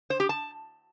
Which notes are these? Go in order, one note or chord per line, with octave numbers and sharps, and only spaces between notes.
C5
G4
A5